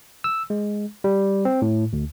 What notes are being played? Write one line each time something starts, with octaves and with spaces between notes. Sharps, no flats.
E6
G#3
G3
C4
A2
D2